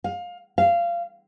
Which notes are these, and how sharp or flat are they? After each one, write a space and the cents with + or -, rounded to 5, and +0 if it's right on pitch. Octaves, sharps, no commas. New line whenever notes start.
F5 +20
F5 -20